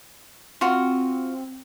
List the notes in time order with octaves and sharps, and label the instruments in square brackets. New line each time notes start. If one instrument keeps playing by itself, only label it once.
[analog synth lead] C4 [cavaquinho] F4 F#4